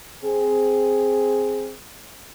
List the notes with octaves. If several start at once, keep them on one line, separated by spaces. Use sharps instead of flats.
C4 G#4